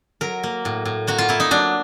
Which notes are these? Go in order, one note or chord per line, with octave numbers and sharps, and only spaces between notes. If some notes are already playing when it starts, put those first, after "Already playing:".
F#3 A#4
A#3
A2
A2
A#3 F#4
F4
A#3 E4
D#4
F#3 D4